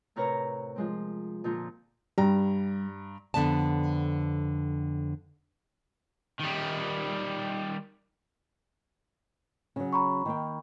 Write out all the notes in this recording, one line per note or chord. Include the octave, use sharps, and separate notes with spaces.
A2 C3 A#4 B4 C#5 A#5
F3 G#3 C4
A#2 D3 F3 A#4 G6
G2 G3 A#5
F2 D3 F3 B3 D5 A5
D#3 G3
C#3 F#3
A#5 B5 C#6
D#3 A#3 G5